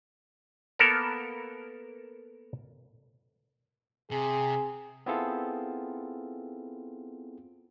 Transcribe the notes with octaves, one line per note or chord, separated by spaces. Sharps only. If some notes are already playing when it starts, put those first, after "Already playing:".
A#3 B3 A4 A#4
C3 G#4
B3 C4 E4 F4 G#4 A4